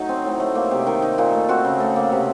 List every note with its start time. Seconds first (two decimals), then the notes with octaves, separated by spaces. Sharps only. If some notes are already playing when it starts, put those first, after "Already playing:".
Already playing: F#3 A3 D#4
0.09 C4
0.25 A2
0.40 A3
0.55 A#3
0.71 C3
0.87 D#3
1.02 D#4
1.18 A#2
1.33 A3
1.49 C4 F#4
1.65 C#3
1.80 A3
1.96 A#3
2.12 C3